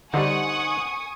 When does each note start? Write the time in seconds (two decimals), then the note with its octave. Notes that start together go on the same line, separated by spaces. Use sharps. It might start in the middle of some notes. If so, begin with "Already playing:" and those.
0.14 D3 G3 D#4 C5 F#5 G#5 C#6 D#6